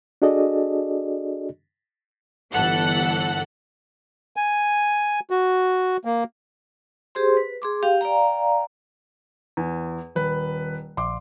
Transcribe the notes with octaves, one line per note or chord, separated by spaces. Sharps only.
D4 F#4 G#4 A4 D5 D#5
G1 E3 A4 F#5 F#6
G#5
F#4
A#3
G4 G#4 C5 C6
B4
G#4 C6 D6
G4 F5 G5
D5 F5 G5 A#5
E2
D#1 B4
A#1 C6 D6